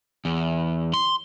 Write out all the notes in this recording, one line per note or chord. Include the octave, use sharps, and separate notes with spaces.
E2
C6